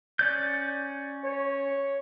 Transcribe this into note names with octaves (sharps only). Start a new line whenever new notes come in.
C#4 D5 G6
C#5